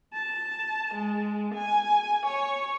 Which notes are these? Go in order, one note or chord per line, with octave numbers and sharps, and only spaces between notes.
A5
G#3
G#5
C#5